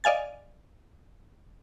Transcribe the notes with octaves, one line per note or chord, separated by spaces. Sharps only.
D5 D#5 F5 G#5 A6